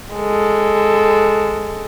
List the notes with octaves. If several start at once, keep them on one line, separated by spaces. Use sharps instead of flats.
G#3 A4